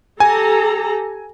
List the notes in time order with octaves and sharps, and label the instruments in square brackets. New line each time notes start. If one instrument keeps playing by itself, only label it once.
[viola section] G4 A4 A#5 [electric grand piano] G#5